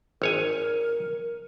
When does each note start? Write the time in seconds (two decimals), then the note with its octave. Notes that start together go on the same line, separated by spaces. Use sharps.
0.22 G#1 A#4 C#5 G#5